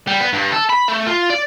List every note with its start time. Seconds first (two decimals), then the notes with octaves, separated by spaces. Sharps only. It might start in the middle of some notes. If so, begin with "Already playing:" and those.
0.07 G3
0.21 B3
0.33 G2
0.52 A4
0.70 B5
0.88 A3
1.07 F4
1.30 D5